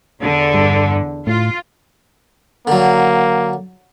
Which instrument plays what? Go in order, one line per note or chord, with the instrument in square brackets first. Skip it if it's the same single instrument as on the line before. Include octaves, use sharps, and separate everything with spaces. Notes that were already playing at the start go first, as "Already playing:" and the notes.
[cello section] E2 D3
[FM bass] G2
[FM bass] A2 [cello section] F4
[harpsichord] D3 F#3 [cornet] A#3